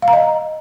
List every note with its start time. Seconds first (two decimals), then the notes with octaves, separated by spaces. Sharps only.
0.02 F5
0.08 A#5
0.13 D#5